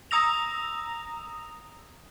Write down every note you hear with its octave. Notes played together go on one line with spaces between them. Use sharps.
A#5 D#6 E6 A#6 F7